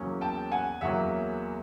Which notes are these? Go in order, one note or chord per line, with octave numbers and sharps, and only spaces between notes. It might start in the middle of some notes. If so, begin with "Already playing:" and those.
Already playing: E2 C#3 F#3 A#3 C#4
G5 A5
F#5 G#5
E2 C#3 F#3 A#3 C#4 E5 F#5